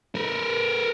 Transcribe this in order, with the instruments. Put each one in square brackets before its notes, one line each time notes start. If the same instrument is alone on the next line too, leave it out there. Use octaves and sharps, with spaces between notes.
[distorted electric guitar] A#4 B4